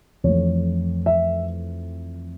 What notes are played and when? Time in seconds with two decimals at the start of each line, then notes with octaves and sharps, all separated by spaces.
0.24 F2 E3 A3 C#5
1.06 E5